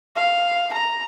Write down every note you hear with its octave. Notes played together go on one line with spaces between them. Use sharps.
F5
A#5